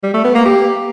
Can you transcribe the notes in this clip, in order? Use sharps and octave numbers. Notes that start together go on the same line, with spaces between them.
G3
A3
B3
A#3
G4